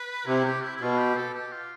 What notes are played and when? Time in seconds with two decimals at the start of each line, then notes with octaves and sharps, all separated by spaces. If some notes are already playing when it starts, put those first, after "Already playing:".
Already playing: B4
0.26 C3 E4
0.44 G4
0.63 E4
0.76 E4
0.81 B2 F4
0.98 G4
1.17 A4
1.34 G4
1.52 F4